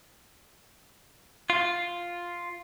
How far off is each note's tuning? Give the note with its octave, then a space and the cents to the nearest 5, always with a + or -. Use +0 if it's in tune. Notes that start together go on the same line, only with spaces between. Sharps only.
F4 +0